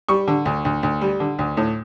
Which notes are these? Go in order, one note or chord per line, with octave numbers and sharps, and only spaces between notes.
G3 C#6
D3
D2
D2
D2
G3
D3
D2
A2